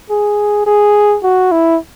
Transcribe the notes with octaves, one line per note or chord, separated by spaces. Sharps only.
G#4
G#4
F#4
E4